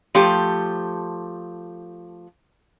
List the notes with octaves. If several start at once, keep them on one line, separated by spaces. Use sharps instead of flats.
F3 A3 G4